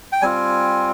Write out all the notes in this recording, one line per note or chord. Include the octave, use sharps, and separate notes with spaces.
G5
G3 C4 F4 G#5